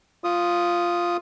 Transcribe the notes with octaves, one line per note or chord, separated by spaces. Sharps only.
F4 D#6